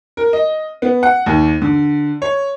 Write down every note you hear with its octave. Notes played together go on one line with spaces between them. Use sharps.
A#4
D#5
B3
F#5
D#2
D3
C#5